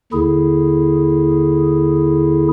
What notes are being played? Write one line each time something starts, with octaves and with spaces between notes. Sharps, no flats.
D#2 D3 E4 G#4